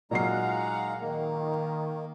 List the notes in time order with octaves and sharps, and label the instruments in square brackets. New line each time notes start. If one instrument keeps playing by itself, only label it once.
[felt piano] A#2 F#3 C7 [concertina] G#3 D#4 A#5 [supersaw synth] F5 F#5
[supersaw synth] D#3 [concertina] A#3